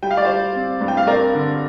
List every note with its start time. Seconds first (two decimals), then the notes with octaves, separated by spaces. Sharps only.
0.03 G3 G5
0.10 F5
0.17 D5
0.25 G3 C5 F5
0.55 C4
0.81 G2
0.88 G5
0.97 F5
1.07 C4 A#4 D5
1.33 D3